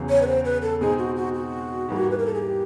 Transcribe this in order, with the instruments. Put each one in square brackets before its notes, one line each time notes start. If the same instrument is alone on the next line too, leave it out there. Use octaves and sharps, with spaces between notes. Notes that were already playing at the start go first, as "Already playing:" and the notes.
Already playing: [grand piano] E2 C#3 F#3
[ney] C#5
B4
C5
B4
A4
[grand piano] B2 G#3 C4 D#4 [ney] G#4
[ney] F#4
F#4
F#4
[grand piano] G#2 E3 G3 A#3
[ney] B4
A#4
A4
G#4
G4